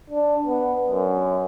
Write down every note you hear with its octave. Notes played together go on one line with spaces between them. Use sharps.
D4
B3
F#2